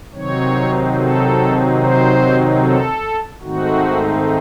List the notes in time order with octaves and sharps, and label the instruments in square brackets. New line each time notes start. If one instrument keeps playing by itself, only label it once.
[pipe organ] C3 D#3 F#3 C4 D#4 C#5
A4
C5
A4
G#2 D#3 A3 C4 D#4 F#4